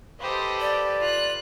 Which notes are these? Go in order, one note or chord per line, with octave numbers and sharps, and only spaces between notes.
G4 A4 B4 C5 D#5
D5 G5
F4 F#6